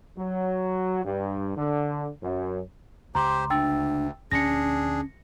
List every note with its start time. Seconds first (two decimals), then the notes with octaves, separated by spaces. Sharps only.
0.18 F#3
1.05 G2
1.57 D3
2.23 F#2
3.15 C#2 G4 C5 A#5 C6 D6
3.50 D2 D4 G5 E6 A6
4.32 D2 A#2 F3 C#4 D4 G#4 A#6 C#7